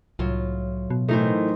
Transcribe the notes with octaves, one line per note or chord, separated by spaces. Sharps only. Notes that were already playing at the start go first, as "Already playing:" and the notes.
C2 A2 F#3 F4
B2
A2 E3 A3 D#4 A#4 C5